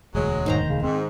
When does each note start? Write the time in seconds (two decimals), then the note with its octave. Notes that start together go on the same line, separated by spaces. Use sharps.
0.15 E1 D2 F#3 G#3
0.46 G#2 D#3 C5 A#5
0.69 C#3
0.83 G#2 C4